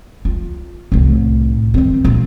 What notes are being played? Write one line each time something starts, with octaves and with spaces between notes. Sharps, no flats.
F4
C2 A2
D#3 C4
A#1